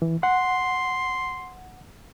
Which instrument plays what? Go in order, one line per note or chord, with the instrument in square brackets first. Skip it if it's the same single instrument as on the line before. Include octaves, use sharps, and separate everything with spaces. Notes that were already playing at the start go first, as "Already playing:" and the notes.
[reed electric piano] E3
[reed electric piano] F#5 [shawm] C6